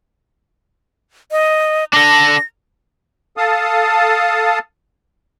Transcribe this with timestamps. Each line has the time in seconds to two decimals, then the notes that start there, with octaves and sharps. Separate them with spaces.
1.32 D#5
1.93 D4 A4 A#6
3.37 A4 F5 A5 D#6